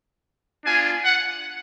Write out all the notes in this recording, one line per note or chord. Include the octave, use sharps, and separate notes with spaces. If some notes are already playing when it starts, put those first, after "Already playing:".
B3 D4 F4 G#5
F#5